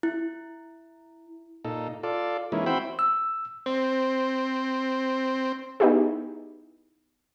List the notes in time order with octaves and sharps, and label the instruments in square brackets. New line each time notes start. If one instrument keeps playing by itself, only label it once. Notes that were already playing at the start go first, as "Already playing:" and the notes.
[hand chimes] E4
[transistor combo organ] A#2 D#4 A4
F4 A4 D5
E3 G#3 A#3 C#4 D#4 E4
C4 F#4 C5 E5 G5 B5
[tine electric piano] E6
[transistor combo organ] C4 [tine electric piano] C5
[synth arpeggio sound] B3 D#4 E4 G4 G#4